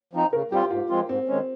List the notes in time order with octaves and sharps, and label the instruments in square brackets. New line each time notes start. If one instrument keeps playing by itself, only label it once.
[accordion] F3 C4 D#4
[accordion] C#3 [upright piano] A#4
[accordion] G3 C4 F4 [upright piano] G4
[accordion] G#2 [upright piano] F4
[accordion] F3 G#3 C4 F4
[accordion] G#2 [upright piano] C4
[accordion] D#3 G#3 C#4